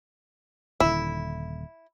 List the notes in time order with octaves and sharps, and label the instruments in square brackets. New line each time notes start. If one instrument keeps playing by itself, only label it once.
[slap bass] D#1 D3 [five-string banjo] E4